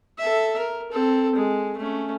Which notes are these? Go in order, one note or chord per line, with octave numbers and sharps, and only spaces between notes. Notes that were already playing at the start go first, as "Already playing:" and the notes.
A4 E5
A#4
C4 A4
G#3
A3 C#4